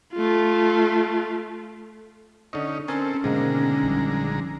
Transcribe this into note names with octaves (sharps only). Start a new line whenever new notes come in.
A3 F4
D3 C#4 D#4 D#5
C4 C#4 A4 A#4 G#5
G#2 B2 D3 D#3 G#3 A#3 A#5
A#1 F3 G3